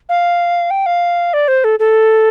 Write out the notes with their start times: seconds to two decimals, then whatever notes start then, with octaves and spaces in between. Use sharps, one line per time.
0.09 F5
0.70 G5
0.86 F5
1.33 D5
1.48 C5
1.64 A4
1.79 A4